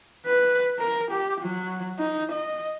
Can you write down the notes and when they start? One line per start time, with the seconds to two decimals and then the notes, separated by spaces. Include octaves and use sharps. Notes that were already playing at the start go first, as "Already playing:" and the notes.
0.26 B4
0.79 A#4
1.11 G4
1.40 F#3
1.98 D#4
2.32 D#5